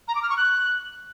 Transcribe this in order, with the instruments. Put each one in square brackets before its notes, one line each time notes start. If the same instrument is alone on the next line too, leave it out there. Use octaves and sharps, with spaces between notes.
[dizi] A#5
D6
F6
C#6
F#6